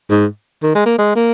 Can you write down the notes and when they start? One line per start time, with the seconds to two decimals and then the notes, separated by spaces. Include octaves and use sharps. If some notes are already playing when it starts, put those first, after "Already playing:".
0.09 G#2
0.63 D#3
0.75 G#3
0.86 A#3
0.98 G#3
1.15 A#3